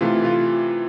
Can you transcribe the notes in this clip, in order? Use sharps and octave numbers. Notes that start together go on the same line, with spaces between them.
C3 E3 A3 F4
F4